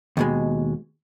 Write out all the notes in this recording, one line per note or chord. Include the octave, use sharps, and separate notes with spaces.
D#2 B2 G#3